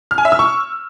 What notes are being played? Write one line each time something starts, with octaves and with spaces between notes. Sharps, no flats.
F6
G#5
E5
E6
C#6